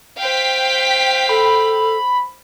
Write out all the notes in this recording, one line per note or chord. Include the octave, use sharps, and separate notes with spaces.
C5 F5 G5 B6
A4 B5